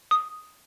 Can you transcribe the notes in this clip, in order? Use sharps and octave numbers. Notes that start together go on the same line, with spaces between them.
D#6